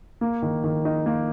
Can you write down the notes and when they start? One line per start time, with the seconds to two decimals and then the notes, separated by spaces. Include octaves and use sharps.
0.21 A#3
0.42 D#3
0.64 D#3
0.85 D#4
1.06 A#3